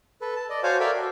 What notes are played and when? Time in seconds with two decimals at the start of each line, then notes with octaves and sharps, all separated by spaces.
0.21 A4 B4
0.36 A5
0.50 D5 D#5
0.63 F#4 C5 C#5 F5 G#5 A5
0.80 A4 A#4 D5 E5 F5 G5
0.94 F#4